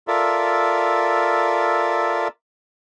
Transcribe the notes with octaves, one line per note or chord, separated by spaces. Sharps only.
F4 A4 A#4 D5 E5